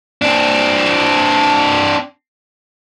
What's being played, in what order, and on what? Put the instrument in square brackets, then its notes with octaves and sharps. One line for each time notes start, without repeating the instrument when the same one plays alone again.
[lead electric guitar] C4 D4